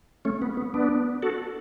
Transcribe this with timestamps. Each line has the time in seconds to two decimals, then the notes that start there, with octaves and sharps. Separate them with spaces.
0.25 A3 C#4
0.42 B3
0.57 B3
0.74 B3 D4
1.22 F#4 A4